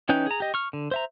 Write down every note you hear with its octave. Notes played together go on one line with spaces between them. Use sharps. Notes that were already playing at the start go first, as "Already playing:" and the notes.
E3 C#4 D#4 B4 G5
G#4 A#5
G4 D#5
C#6 F6
D3
C5 E5 A#5